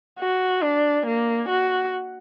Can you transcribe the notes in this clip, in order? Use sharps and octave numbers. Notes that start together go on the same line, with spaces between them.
F#4
D4
A#3
F#4